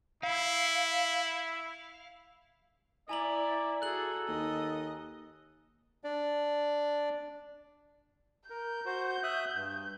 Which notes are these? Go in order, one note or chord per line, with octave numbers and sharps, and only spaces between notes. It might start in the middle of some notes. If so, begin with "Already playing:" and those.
E4 F5
E4 D5 G#5 A#5 F#7
F#4 G#4 A4 F#6 F#7
D#2 D#5
D4 D5
A#4 G6
F#4 C5
E5 D#6 F#6
G2